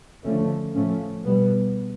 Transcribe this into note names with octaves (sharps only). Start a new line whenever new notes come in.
D3 F3 A3 C#4
A2 F3 A3 C#4
B2 G3 B3